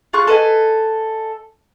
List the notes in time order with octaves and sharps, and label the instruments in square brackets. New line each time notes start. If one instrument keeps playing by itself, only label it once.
[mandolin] F4 G#4 C#6 F#6
A4 B4 D#5 G#5